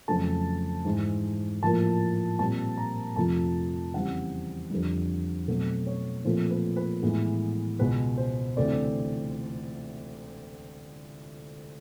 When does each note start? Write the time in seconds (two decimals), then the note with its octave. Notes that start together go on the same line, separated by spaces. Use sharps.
0.08 F2 C#3 F#3 A3 A5
0.85 G#2 E3 G#3
1.62 A2 F3 A#3 A5
2.39 A#2 G3 C4 A5
2.78 A#5
3.16 F2 C3 F3 A3 A5
3.94 E2 C#3 E3 G3 C4 F#5
4.70 F2 D3 G3
5.48 B2 F#3 A3 C4
5.87 C#5
6.25 A#2 F3 A3 C4 C5
6.50 B4
6.76 B4
7.02 A2 E3 G#3 B3
7.79 C#2 B2 G#3 B3 B4
8.18 C5
8.57 D2 C3 E3 A3 C4 D5